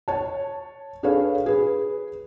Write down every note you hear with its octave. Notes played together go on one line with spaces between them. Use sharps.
C#5 A5
D4 G#4 A4 B4 C#5 F5
G#4 B4